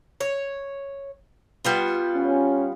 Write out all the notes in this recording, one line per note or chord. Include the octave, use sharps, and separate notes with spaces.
C#5
G3 B3 F4
C#4